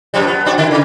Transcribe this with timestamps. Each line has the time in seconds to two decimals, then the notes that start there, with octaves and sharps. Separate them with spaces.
0.14 F#2 F3 G3
0.27 B3
0.45 C4 D4 F#4
0.58 D3 E4
0.71 C#3